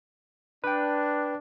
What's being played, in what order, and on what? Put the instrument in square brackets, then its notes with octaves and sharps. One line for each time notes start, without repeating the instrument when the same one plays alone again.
[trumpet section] D4 [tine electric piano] B4 G5